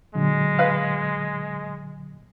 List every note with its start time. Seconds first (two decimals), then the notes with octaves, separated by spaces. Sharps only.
0.15 A#2 D3 F#3 G#3
0.59 B4 F5